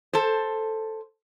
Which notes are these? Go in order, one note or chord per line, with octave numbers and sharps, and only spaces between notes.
A4 C5